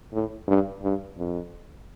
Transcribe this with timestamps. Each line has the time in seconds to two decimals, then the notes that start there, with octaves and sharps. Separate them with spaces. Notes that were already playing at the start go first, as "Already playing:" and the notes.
0.13 A2
0.48 G2
0.82 G2
1.18 F2